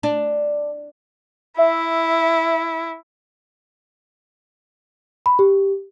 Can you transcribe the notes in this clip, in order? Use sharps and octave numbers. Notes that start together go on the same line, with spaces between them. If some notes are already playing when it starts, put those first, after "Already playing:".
D4
E4 E5
B5
G4